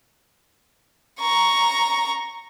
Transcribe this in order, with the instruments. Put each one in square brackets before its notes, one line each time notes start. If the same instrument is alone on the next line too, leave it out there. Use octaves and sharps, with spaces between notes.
[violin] A#5 C#6